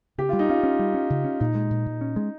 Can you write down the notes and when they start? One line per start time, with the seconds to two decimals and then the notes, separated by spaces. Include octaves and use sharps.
0.18 C#3 G4
0.29 G3 F4
0.39 D#4
0.49 C#4 F4
0.63 C#4
0.79 G3
0.94 C#4
1.10 C#3
1.24 C#4
1.40 A#2 D#4
1.55 G#3
1.71 A#2
1.86 A#2
2.01 C#4
2.16 G#3